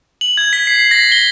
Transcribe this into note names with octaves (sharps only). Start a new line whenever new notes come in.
F#7
G#6
B6
C7
A#6
G7